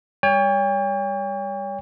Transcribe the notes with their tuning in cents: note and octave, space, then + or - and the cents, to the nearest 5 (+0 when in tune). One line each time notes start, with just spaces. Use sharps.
G3 +35 C#5 +30 G5 +40